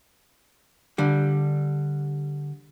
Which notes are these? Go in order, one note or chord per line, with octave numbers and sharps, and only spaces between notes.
D3 G3